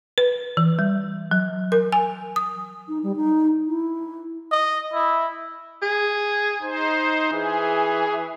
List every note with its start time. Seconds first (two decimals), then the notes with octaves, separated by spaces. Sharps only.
0.18 B4
0.57 E3
0.79 G3
1.31 F#3
1.72 A#4
1.92 G#5
2.36 D#6
2.88 D#4
3.03 G3
3.16 D#4
3.67 E4
4.51 D#5
4.94 E4
5.82 G#4
6.62 D#4 C5
7.32 E3 G#4